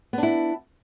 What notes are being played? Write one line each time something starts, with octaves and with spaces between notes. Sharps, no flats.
B3 D4 E4